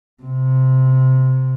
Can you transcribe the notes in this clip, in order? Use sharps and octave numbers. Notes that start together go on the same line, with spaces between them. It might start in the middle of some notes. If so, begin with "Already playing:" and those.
C3